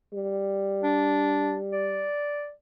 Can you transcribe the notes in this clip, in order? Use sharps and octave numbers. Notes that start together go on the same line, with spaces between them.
G3
D4
D5